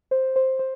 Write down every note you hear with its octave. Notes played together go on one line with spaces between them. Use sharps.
C5
C5
C5